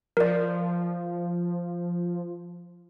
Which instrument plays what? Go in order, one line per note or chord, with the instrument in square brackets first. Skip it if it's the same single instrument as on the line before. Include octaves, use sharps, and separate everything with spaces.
[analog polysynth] F3 [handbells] A#4 D5